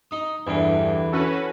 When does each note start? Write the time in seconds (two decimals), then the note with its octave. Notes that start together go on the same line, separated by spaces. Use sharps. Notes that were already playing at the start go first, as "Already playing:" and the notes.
0.11 D#4 D#6
0.47 E2 G2 D3 E3
1.12 C#4 F#4 A4 B4